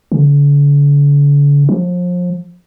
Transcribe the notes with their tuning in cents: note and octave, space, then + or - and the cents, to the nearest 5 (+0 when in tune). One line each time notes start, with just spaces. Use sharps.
D3 -40
F3 +30